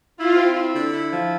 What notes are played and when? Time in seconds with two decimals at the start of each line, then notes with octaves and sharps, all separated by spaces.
0.17 E4 F4
0.35 C4
0.55 E4
0.73 D3
0.92 E4
1.10 F3